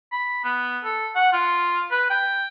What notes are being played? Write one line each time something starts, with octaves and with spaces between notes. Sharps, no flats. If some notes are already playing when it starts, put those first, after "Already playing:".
B5
B3
A4
F#5
F4
B4
G5